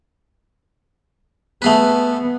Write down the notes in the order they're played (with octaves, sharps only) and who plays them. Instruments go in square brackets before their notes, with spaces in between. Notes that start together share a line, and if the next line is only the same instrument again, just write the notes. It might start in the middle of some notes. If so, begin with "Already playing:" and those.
[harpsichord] A3 G#4 B4 [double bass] B3